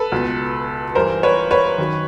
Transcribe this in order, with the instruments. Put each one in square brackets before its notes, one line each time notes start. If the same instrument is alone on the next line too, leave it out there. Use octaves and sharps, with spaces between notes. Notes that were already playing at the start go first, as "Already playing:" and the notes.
Already playing: [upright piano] A4 B4
C#2 B2
G2 E3 A#4 C5
B4 C#5
B4 C#5
F#2 D#3